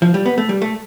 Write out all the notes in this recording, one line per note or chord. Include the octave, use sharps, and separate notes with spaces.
F3
G3
B3
A3
G3
A3